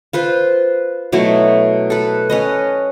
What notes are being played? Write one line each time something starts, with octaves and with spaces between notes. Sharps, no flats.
F4 B4 C5
B2 F#3 A3 E4
A4 B4
C#4 B4 D#5